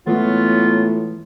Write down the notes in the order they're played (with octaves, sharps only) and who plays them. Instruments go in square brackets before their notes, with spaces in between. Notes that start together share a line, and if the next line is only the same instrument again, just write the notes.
[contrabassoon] A2 [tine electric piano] E3 G#3 [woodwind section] F#3 B3 F4